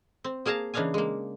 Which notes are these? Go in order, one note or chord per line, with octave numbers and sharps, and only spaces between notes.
C4
A#3 G#4 F5 A5 A#5
C#3 E3 D4 D#4 F5 G#5
G#3 A#3